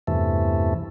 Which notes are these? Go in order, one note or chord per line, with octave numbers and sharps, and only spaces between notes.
E2 G2 C3 E3 A3